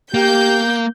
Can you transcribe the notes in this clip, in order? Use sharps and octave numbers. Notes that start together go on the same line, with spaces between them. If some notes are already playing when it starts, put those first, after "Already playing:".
A#3 G4 G6